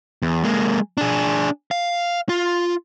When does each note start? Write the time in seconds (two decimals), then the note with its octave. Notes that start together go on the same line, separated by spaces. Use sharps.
0.22 E2
0.43 G#3 A#3
0.98 D4 G#4
1.71 F5
2.29 F4